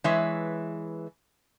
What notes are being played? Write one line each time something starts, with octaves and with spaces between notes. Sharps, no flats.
E3 G#3 B4 C#5 E5